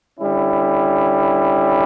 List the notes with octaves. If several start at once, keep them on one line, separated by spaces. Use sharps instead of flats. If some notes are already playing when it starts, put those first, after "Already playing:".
D3 G3 C#4 E4